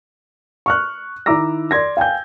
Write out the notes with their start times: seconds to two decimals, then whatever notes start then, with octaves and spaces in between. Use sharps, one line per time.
0.66 C#6 F6 F#6
1.26 D#3 E4 A#5 D6 E6 A#6
1.71 D5 C6 G#6 A#6
1.97 F5 G5 G#5 G6